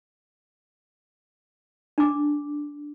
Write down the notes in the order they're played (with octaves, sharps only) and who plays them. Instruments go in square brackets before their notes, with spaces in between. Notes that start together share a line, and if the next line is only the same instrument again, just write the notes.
[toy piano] D4 D6